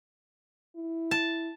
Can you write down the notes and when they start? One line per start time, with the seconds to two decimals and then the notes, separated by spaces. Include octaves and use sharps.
0.76 E4
1.11 A5